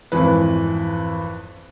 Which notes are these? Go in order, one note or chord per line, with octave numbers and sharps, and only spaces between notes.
G#1 F2 E3 E4 B4